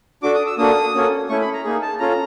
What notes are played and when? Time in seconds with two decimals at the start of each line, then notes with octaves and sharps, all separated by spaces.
0.23 D4 F#4 A4 D6
0.35 D#6
0.47 E6
0.58 A#3 D4 F#4 A4 D#6
0.94 A#3 C#4 F#4 A4
1.29 A3 C#4 E4 C#6
1.41 B5
1.53 A#5
1.64 A#3 D#4 G#4
1.82 A5
2.00 C#4 F4 A4 A#5